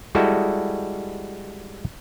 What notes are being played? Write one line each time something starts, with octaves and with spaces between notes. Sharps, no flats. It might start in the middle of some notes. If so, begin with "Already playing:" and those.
G3 G#3 E4 F#4 A4